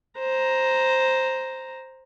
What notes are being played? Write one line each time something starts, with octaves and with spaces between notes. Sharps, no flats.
C5 A#5